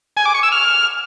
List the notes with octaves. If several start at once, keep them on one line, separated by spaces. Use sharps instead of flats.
G#5
D6
C#6
E6
F6